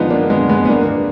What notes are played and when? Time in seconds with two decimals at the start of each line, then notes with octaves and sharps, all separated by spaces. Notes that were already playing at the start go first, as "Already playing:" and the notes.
Already playing: F3 G#3 B3 D4 D#4 F4
0.10 A#3 D4
0.30 G#3 B3
0.49 G#3 B3
0.65 B3
0.69 A#3 D4